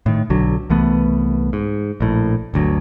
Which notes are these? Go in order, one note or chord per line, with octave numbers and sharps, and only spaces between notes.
A2 D#3
B1 D3 F#3
C2 E3 A3 B3
G#2
A#1 A2
G1 D2 F#3